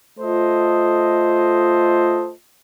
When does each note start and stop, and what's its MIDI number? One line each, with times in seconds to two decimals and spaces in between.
0.19 2.31 57
0.19 2.31 65
0.19 2.31 69
0.19 2.31 72
0.19 2.31 75